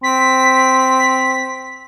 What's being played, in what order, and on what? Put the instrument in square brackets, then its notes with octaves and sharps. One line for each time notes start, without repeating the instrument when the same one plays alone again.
[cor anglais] C4 [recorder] B6